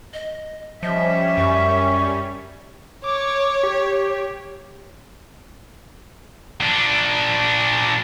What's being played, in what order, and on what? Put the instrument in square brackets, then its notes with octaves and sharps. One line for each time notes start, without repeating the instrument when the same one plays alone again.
[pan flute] D#5
[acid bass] F3 [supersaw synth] G3 C#4 [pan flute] D#5 [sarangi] E5
[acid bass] F#2 [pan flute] C#6
[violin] C#5 [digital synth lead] D6
[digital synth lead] G4
[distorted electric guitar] A#2 D4